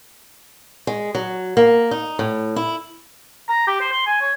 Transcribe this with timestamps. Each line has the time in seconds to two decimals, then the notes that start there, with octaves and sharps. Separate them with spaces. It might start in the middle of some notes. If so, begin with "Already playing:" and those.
0.87 G#3
1.15 F#3
1.57 A#3
1.91 D#4
2.19 A2
2.56 E4
3.48 A#5
3.67 G4
3.80 C5
3.92 C6
4.06 G#5
4.21 C#5